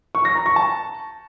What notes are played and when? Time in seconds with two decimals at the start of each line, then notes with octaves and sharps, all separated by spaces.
0.15 C#6
0.25 A#6
0.35 A#5
0.46 C#6
0.56 A5